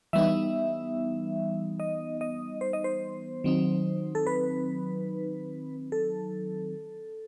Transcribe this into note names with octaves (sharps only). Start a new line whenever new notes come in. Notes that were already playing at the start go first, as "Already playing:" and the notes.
E3 G3 B3 D#4 E5
D#5
D#5
C5
D#5
C5
D#3 F#3 C4 D#4
A4
B4
A4